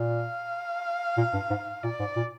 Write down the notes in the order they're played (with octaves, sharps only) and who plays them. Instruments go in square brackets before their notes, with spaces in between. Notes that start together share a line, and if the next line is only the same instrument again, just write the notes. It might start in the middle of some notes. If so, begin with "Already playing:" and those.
Already playing: [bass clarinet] A#2 [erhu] F5
[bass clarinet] A#2
G2
G#2
[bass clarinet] A#2 [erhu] D5
[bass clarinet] G#2
A#2